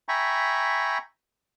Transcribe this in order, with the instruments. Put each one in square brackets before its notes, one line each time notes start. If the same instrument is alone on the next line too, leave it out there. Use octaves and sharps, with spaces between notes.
[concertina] E5 G5 G#5 A#5 B5 C#6